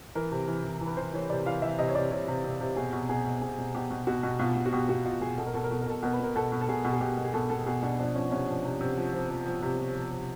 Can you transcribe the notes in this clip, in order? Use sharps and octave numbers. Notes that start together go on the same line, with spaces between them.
E3 A#4
C3
E3
E3
E3
B4
E3 C5
E3 C#5
C3 D5
E3 F5
E3 E5
C3 D#5
C#5
C3 D5
C3 C#5
C3
C3
C3
B2 G#4
B2
B2 G#4
B2
B2 G#4
B2
B2 G4
B2
B2 F#4
B2
B2 F4
B2
F#4
B2 G4
B2 F#4
B2 F4
B2 G#4
B2 A4
A#4
B2 A4
A#4
B2 A4
A#4
B2 A4
B2 A#4
B4
B2 A#4
B2 A4
B2
A4
B2 G#4
B2
G#4
B2 G4
B2
G#4
B2 A4
B2 A4
B2 G#4
B2 D4
F3 D4
F3 C#4
C3 C#4
F3 D4
C3
C3
F3
F3
F3
F3
C3
F3
F3
C3